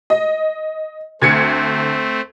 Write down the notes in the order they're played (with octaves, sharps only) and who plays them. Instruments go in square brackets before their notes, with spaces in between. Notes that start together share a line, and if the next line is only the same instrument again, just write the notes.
[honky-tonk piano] D#5
[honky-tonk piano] D2 G#6 C#7 [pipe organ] A3 C4